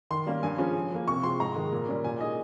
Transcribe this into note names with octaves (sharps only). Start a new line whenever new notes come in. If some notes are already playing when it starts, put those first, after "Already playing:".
D#3 C6
G3 A#3 C#4
G2 G#5
F3 G#3 C#4
C#3
F3 A#3
C3 C#6
F3 G#3 C6
G#2 A#5
D#3 G#3
A#2
G3 C#4
A#2 G#5
G#3 D#4 D#5